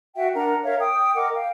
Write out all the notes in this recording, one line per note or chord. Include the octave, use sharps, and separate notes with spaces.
F#4 E5 F#5 G5
D4 A#4 F#5 A#5
A#4 C#5 E5 F5
G5 D#6
A#4 D#5 F#5 D6
F5 G5